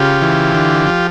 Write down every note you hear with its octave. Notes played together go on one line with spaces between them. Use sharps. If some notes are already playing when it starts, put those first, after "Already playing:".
Already playing: C#3 F4 G4
E3
D3
F3